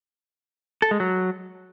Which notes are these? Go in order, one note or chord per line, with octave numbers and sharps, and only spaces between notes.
A4
G#3
F#3